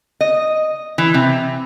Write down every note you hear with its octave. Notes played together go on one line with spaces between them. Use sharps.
D#5
E3
C3